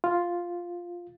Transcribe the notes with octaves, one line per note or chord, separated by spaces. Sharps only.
F4